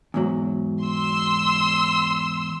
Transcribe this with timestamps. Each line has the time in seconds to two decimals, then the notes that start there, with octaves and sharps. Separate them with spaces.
0.14 E2 G#2 F#3
0.83 C6 E6